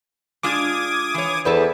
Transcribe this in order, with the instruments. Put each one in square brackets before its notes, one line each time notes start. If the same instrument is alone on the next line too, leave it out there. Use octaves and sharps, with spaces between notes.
[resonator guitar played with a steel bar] G#3 D4 F4 [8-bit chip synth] D6 D#6 G#6
[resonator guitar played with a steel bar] E3 C#5
[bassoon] E2 [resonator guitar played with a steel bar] A4 B4 C5